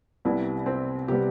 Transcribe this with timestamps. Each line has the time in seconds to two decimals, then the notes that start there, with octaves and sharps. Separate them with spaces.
0.25 C2 C3 G3 B3 E4
0.66 C4
1.08 C3 G3 B3 G4